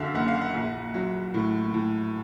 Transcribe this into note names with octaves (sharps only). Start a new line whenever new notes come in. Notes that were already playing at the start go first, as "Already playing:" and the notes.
Already playing: F#2 D3 E5 F5
F#1 F#5
F5
F#5
A#1
F#3
A2
A2